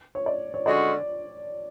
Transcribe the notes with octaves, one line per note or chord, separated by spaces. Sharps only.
C#5
D5
C#5
D3 G#3 C#4 F#4 D5